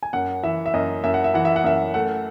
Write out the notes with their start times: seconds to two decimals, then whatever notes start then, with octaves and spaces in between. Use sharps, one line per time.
0.03 G#5
0.13 F#2 F#5
0.43 E3 E5
0.66 E5
0.74 F#2 D#5
1.04 F#2 E5
1.14 F#5
1.24 E5
1.34 E3 F#5
1.45 E5
1.56 F#5
1.64 F#2 E5
1.94 A3 F#5